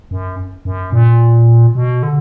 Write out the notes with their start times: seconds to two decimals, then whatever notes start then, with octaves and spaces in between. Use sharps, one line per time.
0.11 F#2
0.65 F#2
0.92 A#2
1.75 B2
2.03 D3